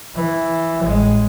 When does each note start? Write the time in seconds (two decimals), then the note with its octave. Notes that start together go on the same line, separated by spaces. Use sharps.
0.15 E3
0.83 A1 G#3